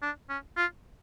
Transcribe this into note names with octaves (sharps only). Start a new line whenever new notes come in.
D4
C#4
F4